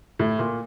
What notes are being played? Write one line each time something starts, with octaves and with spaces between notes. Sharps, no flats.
A2
A#2